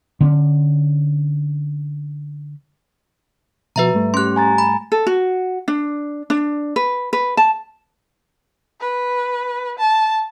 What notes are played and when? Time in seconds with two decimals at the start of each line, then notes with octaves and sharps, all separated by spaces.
0.21 D3 C4 C#4
3.76 B2 F3 F#4 B4 E5 A#5
3.94 G#2 G3 A3
4.14 C#4 G4 C6 F#6
4.36 G#5 A#5 A6
4.58 B5
4.92 A4
5.07 F#4
5.68 D4
6.30 D4
6.76 B4
7.13 B4
7.37 A5
8.80 B4
9.79 A5